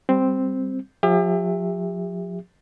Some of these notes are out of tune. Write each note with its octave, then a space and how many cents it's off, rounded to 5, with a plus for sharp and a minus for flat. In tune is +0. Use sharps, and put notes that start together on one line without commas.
G3 +0 C4 +0
F3 +40 G4 +40 E5 +0